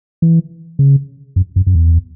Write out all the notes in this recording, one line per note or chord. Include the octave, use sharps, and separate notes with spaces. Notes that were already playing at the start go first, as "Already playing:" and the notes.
E3
C#3
F#2
F#2
F#2
E2